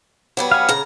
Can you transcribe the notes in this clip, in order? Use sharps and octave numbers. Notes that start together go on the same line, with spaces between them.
F#3 G3 B3
F5 G#5
C#3 A#5